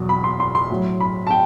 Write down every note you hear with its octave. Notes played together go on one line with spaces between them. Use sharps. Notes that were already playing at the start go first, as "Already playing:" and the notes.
Already playing: E2 B2 F#3
B5
C6
C6
C6
A2 F#3
B5
A5
G5